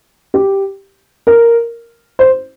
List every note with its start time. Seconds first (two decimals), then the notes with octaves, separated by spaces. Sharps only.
0.34 G4
1.27 A#4
2.19 C5